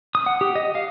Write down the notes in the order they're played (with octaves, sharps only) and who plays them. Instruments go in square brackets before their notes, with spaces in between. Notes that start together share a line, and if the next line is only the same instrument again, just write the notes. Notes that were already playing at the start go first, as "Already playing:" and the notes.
[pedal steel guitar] D#6
F#5
G4
D#5
F5